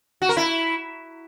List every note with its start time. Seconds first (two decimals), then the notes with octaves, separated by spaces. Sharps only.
0.22 F#4
0.29 A#4
0.37 E4